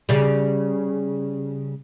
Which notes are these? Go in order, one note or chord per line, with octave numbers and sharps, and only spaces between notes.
C#3 G3